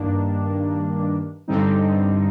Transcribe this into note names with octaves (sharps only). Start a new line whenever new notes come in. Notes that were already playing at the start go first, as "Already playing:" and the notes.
Already playing: G2 D#3 A#3 D4
G2 D3 G3 C4 D#4